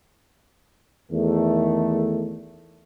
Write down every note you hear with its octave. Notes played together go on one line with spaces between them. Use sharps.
E2 D#3 A3